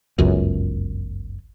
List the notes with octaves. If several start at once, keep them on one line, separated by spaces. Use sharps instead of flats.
G1 C#2 F#2